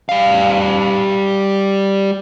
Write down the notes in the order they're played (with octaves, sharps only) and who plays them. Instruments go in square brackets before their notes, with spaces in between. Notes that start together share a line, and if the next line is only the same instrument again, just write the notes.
[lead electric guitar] G3 F5